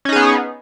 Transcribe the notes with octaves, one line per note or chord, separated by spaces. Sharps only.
B3 C#4 D#4 G#4